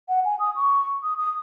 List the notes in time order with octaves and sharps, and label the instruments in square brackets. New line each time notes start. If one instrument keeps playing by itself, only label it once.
[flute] F#5
G#5
D#6
C#6
D#6
D#6